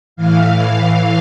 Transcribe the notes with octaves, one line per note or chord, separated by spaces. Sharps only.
A2 E3 F5
F5